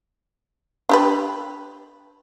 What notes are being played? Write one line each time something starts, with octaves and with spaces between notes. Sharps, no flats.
D4 G4 B4